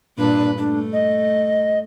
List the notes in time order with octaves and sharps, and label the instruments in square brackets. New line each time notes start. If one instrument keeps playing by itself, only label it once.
[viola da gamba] G2 A#2 B4 [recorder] D4
[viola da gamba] A3 [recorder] D4
[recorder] D#5